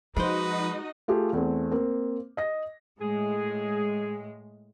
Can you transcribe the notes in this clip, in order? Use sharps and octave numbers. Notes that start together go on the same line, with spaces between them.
F3 G#3 D#4 F#4 B4 C5 D#5
A3 F4 G4 G#4
E2 A3 C4
A#3 C4
D#5 A#6
A2 G#3 G#4